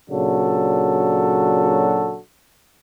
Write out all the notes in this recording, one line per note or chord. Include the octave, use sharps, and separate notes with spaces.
A#2 C#3 F#3 D4 F#4 A4